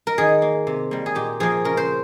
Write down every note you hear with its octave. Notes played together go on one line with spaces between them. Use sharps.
A#4
D#3 G#4
A#3
C3
G3 A#3
G#4
A#2 G4
F3 A#3 G#4
C#3 A#4
C5